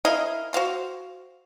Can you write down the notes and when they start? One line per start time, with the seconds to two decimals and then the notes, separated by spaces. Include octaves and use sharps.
0.05 E4 A#4 D#5 F5
0.53 F#4 C5 F5 C6